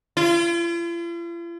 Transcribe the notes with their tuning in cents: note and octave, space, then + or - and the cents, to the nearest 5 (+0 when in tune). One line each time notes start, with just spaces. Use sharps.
F4 -45